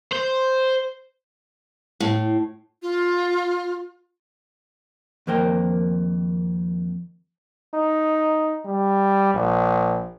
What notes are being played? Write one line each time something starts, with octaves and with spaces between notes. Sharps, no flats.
C5
A2
F4
F2 D#3 A#3 A#4 C5 G5
D#4
G3
A#1